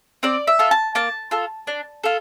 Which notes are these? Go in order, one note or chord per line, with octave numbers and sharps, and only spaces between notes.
C4 D5
E5
F4 A4
A5
A#3 A5
F4 A4
D4
F4 A4